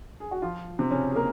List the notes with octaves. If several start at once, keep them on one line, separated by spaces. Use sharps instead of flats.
G#4
F#4
F3 F4
C3 C4
C#3 C#4
G#4
A#3 A#4